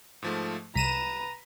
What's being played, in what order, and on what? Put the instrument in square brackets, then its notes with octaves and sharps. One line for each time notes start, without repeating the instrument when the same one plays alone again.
[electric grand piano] G#2 F3 A3
[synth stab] C2 D#7 E7 [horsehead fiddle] B4 A#5 [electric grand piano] B6